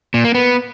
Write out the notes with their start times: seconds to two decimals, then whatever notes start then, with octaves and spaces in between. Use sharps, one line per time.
0.14 A#2
0.24 A#3
0.35 B3